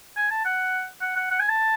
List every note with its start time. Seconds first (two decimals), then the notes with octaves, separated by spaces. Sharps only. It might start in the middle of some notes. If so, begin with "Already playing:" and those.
0.17 G#5
0.31 A5
0.45 F#5
1.01 F#5
1.16 F#5
1.31 F#5
1.40 G#5
1.49 A5